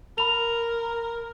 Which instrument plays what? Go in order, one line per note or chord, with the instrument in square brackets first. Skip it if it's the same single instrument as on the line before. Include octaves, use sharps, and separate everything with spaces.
[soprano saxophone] A#4 [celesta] B5 F7